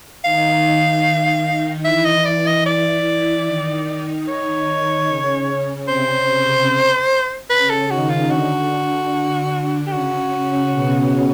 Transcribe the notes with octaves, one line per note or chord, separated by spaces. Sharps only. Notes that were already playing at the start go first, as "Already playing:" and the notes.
D#3 D#4 F5
E3 E4 E5
D#5
E3 E4 D5
D#5
D5
D#3 D#4
C#5
C#3 C#4
C3 C4 C5
C#3 C#4 B4
A4
D#3 D#4 F#4
F4
D3 D4 F#4
G4
C#3 C#4 F#4
B2 B3